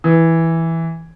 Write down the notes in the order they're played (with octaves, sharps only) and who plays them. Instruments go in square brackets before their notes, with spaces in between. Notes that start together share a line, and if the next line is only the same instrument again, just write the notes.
[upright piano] E3